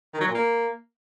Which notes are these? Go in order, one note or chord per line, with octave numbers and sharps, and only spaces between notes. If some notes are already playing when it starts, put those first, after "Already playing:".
D#3
F#3
A#2
A#3